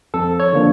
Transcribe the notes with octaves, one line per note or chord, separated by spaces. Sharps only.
F2 A4
C#5
D3 F3 A#3 D4